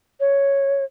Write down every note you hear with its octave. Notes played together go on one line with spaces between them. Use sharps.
C#5